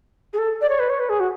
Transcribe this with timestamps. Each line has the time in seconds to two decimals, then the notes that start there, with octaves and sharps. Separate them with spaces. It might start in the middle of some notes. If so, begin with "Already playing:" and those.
0.33 G#4
0.38 A4
0.61 D5
0.69 C#5
0.79 B4
0.89 C#5
1.00 B4
1.09 G#4
1.20 F#4